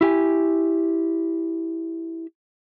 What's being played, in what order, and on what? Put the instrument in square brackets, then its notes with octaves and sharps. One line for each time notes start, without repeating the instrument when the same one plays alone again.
[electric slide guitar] E4 G4 G#5